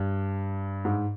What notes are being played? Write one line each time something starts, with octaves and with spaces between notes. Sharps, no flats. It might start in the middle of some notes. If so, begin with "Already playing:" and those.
Already playing: G2
G#2